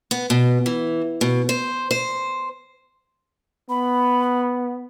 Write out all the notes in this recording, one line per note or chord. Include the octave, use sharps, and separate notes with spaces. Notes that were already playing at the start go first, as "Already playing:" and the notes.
B3
B2
E3
B2
C5
C5
B3 B5